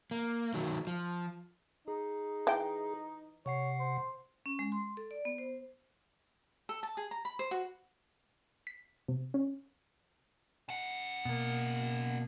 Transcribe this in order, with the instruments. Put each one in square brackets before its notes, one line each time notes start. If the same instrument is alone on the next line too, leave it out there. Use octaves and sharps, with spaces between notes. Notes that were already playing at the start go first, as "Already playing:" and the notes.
[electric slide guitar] A#3
D#3 F#3 A3
F3
[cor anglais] D#4 [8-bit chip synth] G#4
[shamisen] E3 G5
[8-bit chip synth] C3 F#5 C7 [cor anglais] C#5
[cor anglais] C5
[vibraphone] C#4
G#3
C6
A4
D5
B3
C5
[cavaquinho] A4
A5
G#4
A#5
B5
C5
F#4
[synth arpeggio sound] B6
C3
C#4
[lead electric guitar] C#3 F#5
[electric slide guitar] B2 A#3